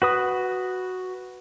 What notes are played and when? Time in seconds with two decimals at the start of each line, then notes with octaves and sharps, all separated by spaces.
0.02 F#4 B4 D#6